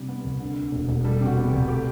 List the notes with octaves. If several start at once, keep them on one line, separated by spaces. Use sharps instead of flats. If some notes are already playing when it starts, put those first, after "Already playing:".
Already playing: C3 G3 G4
B3
C2
D3
D2
E1
E1
G3 A4
C3 G4
F#4
B3
G4
C2
A3 G4